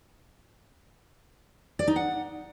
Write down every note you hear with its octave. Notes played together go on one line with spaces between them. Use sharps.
D5
D#4
F#5